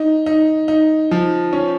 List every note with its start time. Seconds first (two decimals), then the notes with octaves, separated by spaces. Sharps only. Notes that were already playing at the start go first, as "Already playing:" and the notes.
Already playing: D#4
0.26 D#4
0.68 D#4
1.11 F3
1.53 C#4